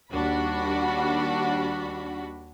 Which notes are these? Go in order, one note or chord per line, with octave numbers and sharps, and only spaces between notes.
D#2 G3 D4 F#4 B5